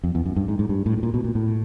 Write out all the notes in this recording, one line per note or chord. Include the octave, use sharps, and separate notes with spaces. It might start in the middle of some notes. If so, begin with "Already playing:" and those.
F2
E2
F#2
G2
G#2
G#2
G2
A2
A2
A#2
B2
A#2
A2